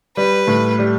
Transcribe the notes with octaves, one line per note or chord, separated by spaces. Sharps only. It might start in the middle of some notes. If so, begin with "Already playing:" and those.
G3 B4
A2
G3